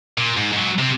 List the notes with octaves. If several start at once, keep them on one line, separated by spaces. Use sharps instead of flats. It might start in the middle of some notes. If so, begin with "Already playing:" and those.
A#2
G#2
G#2 F#3
C3 C4